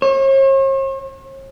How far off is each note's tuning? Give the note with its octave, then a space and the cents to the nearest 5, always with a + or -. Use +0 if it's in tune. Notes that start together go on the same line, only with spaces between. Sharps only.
C#5 -45